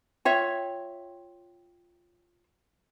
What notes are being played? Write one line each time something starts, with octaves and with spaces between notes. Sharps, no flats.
F4 C#5 E5 G5